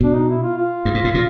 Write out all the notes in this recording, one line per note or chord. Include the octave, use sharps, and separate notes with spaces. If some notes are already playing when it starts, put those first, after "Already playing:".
B2 D4
D#4
E4
F4
F4
G2
G#2
A2
A#2